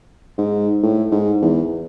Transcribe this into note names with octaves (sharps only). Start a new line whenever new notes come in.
G#2
A2
G#2
E2